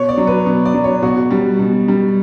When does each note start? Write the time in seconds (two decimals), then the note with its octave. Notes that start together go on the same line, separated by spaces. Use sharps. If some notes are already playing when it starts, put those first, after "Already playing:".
Already playing: B2 C#5
0.09 D5
0.17 F#3
0.27 B4
0.46 B2
0.65 D5
0.74 F#3
0.84 C#5
1.02 B2 F#4
1.31 G3
1.59 B2
1.88 G3